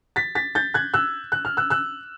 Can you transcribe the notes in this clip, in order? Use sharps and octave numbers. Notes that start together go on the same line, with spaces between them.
A6 B6
A6 B6
G6 A6
F#6 G#6
E6 F#6
F#6
F6
E6 F#6
E6 F#6